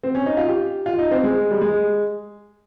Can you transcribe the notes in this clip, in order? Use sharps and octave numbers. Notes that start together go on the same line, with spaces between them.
C4
C#4
D#4
F4
G4
F4
D#4
C4
G#3
G3
G#3